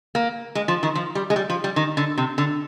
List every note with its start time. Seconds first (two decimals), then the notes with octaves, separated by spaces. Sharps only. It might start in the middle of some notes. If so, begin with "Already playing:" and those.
0.15 A#3
0.55 G#3
0.68 F3
0.83 D#3
0.95 F3
1.15 G3
1.30 G#3
1.36 G3
1.50 F3
1.64 G3
1.76 D#3
1.97 D3
2.17 C3
2.38 D3